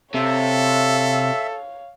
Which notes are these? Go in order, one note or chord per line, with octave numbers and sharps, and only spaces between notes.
C3 A4 C#5 E5 F5